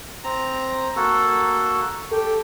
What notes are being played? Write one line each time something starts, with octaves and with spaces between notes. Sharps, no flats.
C4 A#5
A#3 F#4 A4
G4 A4